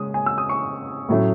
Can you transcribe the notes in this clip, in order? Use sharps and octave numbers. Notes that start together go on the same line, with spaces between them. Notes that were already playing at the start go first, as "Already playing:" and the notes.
Already playing: C#3 G#3 C#4 D#6
G#5
E6
D#6
C#6
A2 F#3 A3 C#4